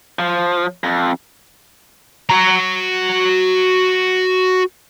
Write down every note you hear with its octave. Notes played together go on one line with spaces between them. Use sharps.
F3
F2
F#4 A#5